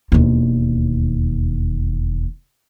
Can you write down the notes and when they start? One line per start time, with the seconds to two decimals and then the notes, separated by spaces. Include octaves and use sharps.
0.12 E1 D#2